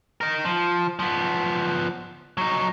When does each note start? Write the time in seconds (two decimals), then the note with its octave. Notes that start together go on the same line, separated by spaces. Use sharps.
0.21 D#4 A#4
0.45 F3
0.99 F3 B3
2.37 F#3 D#4